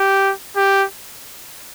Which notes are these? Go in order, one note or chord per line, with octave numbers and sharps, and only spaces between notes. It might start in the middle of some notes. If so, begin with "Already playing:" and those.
Already playing: G4
G4